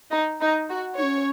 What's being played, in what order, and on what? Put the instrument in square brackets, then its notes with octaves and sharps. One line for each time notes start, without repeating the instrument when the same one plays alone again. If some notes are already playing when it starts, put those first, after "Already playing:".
[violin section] D#4
D#4
F#4
[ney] D#4 [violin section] C#5
[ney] C#4